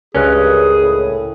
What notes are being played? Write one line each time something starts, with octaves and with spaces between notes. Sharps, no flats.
C#2 G2 C#4 G#4 A#4 F#6
A2